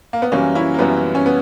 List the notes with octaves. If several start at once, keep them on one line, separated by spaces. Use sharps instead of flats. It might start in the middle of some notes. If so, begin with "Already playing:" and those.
A#3
B3
F#2 E3 G3 A#3 C#4
C#4 E4
A#3
F#2 E3 G3 B3
C#4
B3